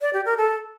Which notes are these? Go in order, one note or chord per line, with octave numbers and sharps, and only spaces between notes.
D5
G4
A#4
A4